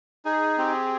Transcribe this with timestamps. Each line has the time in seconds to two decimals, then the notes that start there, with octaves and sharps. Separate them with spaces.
0.25 D#4 G#4
0.58 C4 G4